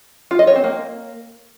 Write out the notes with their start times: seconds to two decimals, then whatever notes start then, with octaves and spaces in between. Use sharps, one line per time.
0.31 F4
0.39 D#5
0.47 C#5
0.56 C4
0.64 A#3